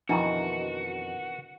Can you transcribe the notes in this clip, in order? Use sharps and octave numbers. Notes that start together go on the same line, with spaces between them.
F2 B2 D#3 E3 D4 E4 F#4 A#5